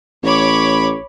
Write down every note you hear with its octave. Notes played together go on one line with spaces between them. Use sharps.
A1 C#5 B5 D6